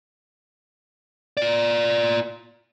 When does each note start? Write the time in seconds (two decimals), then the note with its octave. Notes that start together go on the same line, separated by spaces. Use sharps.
1.37 F4 D5